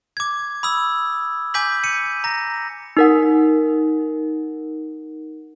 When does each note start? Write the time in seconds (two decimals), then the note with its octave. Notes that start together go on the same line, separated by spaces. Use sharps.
0.17 D6 G#6
0.63 B5 D#6 E6
1.54 G#5 D6 G6 B6 F#7
1.84 C#7 D#7
2.24 A#5 A#6
2.97 D#4 A#4 F#5